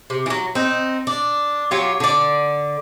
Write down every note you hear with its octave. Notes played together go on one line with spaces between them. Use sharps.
C3
E3 F#3
C4 D#4
D4
F#3 F4 G4 C#5
D3 D5